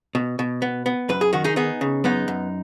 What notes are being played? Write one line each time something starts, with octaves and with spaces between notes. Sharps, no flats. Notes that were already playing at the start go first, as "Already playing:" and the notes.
B2
B2
B3
B3
F#2 B4
G#4
D#3 F#4
D#4 G#4
B3 D#4 G#4
C#3
F#2 B3 D#4
F#2